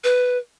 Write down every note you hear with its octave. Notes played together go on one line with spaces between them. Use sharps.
B4